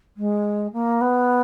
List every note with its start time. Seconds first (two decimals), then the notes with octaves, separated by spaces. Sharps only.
0.17 G#3
0.73 A#3
1.01 B3